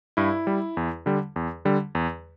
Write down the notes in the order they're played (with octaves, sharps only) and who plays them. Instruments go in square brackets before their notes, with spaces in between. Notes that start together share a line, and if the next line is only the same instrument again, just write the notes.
[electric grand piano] G2 E4
G3
E2
D3 G3
E2
D3 G3
E2